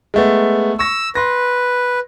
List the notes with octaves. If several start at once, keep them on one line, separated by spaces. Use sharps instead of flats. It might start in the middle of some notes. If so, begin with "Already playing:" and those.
G#3 A3 B3
C#6 E6 A#6
B4 C6 A#6